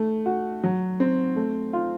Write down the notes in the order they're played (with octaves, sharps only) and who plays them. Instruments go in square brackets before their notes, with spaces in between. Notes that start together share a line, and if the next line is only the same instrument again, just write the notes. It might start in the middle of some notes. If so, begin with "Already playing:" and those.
Already playing: [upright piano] A3
F#4
F#3
C4
A3
F4